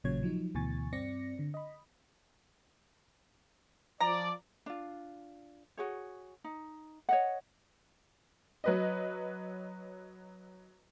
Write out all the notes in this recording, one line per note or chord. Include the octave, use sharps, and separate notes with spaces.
A1 A#2 C#3 F#3 C#5 G#6
F3 F#3 D#4
D2 B2 E3 G#5 C#6 A6
G2 C4 D5 A#6 C#7
D3
D#5 B5
F3 D5 A#5
D4 F4
F#4 G#4 C#5
D#4
C#5 D#5 F#5
F#3 B4 D#5